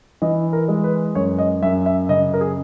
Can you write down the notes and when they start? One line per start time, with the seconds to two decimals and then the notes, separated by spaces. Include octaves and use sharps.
0.22 E3 D#5
0.53 A#4
0.68 G#3
0.84 B4
1.15 F#2 C#5
1.38 D#5
1.62 F#2 E5
1.86 E5
2.09 C#3 D#5
2.34 A#4
2.41 G#4